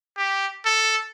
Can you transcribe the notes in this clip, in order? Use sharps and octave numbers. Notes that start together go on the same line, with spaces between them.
G4
A4